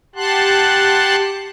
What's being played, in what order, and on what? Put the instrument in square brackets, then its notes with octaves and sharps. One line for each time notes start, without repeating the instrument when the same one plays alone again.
[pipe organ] G4 F#5 A5 C6 F#6